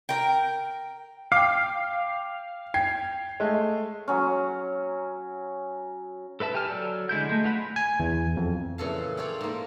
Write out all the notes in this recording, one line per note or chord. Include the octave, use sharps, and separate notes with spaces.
A#4 G5
F5 G5 D6
G5 G#6 C7
G#3 A3
F#3 C#4
A4 B4 E5 A5
G4 G#5 A5 F6
F#3 A4 D5 E6
D3 G#3 E4 G6
G#3 A3
B3 F4 F#5 B5
G#5
E2
F2
A#2 C#3 E3 A4 F5
F4 A4 C#5 D5 F5 G5
G#2 A#3